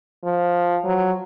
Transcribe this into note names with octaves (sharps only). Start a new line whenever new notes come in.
F3
F#3